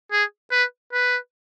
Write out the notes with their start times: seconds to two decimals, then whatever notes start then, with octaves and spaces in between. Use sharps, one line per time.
0.12 G#4
0.51 B4
0.93 B4